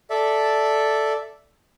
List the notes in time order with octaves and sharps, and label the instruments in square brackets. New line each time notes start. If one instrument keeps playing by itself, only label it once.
[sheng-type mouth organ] A4 D5 E5